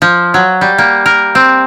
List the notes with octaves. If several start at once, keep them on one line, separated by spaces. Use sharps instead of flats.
F3
F#3
G3
A#3
A#4
C4